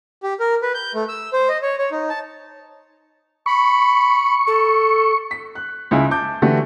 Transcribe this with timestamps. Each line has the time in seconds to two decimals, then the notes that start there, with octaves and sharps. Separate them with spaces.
0.23 G4
0.40 A#4
0.62 B4
0.74 G6
0.95 A3
1.09 E6
1.33 C5
1.49 D#5
1.62 C#5
1.78 C#5
1.91 D#4
2.10 A5
3.46 B5 C#6
4.47 A4
5.31 B6
5.55 F#6
5.91 C#2 G#3 E4 G#5
6.11 A5 D6 G6
6.42 D3 E3 A3 F#4 G4 A4